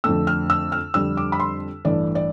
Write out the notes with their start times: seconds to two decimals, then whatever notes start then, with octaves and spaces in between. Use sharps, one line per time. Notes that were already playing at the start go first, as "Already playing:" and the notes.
0.04 F2 D3 A3 E6
0.27 F6
0.50 E6
0.72 F6
0.94 F2 D3 G3 E6
1.17 D6
1.32 B5
1.40 C6
1.85 A1 G2 E3 A3 D5
2.15 D5